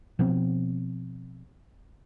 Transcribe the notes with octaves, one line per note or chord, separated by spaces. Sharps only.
B2 F3 B3 C4